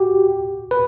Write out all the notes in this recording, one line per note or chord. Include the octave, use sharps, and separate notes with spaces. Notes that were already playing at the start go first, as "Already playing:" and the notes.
Already playing: F#4 G4
B4